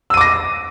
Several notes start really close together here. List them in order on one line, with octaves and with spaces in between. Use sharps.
E6 D#7 D6 A#6